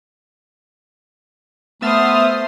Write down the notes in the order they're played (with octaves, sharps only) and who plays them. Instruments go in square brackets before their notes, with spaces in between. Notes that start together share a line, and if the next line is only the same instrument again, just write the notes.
[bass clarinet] A3 [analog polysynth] B3 E5 A6 [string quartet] C5 C6 [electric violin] D#6 F6